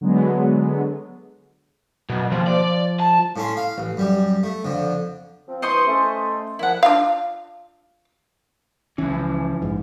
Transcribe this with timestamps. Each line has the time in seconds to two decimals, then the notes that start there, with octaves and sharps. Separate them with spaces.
0.01 D3 F#3 G#3 B3
2.10 F#2 B2
2.32 D#2 F3
2.47 D5
3.00 A5
3.36 A2 C#4 C6
3.57 F5
3.78 A1
3.97 F#2 G3
4.43 A3
4.65 F2 D3
5.48 F3 C4
5.62 G2 E3 C5 D#5 C6 C#6
5.87 A3 C#4
6.59 A#2 D#3 F3 E4 F#5
6.83 D4 F4 F5
8.98 C#2 E3 F3 C#4
9.62 A#1 G#2